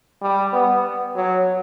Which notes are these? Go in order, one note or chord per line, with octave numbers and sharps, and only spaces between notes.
G3
B3
F#3